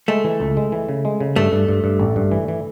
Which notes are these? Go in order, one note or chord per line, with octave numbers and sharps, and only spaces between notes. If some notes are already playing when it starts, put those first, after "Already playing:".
G#3 A3
E3
C#2
G#3
E3
C#3
G#3
C#3
G2 A3
G2
G2
G2
A1
G2
E3
E3